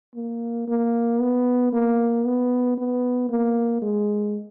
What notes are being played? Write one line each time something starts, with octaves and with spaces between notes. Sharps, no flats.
A#3
A#3
B3
A#3
B3
B3
A#3
G#3